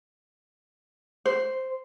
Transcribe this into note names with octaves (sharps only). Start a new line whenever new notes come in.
C5